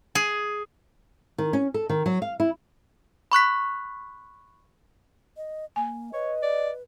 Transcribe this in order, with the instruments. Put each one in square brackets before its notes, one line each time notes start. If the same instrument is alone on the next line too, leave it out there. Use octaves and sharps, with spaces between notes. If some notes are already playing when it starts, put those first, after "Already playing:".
[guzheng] G#4
[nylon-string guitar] D#3
C#4
A4
D#3
F#3
F5
E4
[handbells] B5 C#6 F#6 B6
[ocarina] D#5
[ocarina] A#3 [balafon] G#5
[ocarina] B4 [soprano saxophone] C#5 [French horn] D#5
[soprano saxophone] D5